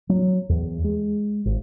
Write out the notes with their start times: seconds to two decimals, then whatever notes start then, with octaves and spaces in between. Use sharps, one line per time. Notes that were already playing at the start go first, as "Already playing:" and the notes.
0.09 F#3
0.49 E2
0.84 G#3
1.45 G#1